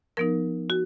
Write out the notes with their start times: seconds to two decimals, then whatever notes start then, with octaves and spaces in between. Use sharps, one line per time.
0.17 F3 B3 D#4 A#4
0.70 F#4